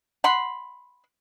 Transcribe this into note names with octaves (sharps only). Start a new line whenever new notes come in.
F#5 B5 C6